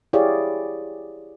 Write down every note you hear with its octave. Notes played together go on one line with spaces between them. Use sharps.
E4 G4 G#4 C#5 D5 F5